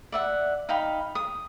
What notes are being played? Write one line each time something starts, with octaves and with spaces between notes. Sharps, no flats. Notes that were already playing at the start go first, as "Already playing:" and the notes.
D5 E5 F#5
D#4 F5 G5 B5
D#6